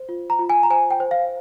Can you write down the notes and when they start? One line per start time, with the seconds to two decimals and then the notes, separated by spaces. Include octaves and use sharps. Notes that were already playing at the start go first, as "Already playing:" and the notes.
Already playing: C5
0.09 F4
0.30 A#5
0.39 F4
0.50 G#5
0.63 A#5
0.70 C5 G#5
0.91 G5
1.00 C5
1.11 F5